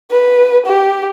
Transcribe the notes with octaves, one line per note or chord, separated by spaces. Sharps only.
B4
G4